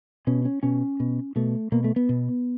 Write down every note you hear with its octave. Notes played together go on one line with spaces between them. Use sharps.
B2 C#4
C#4
B2 C#4
B2
B2 A3
B2 A#3
A3
B3
B2